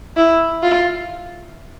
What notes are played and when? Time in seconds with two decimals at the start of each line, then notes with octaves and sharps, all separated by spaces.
0.17 E4
0.62 F4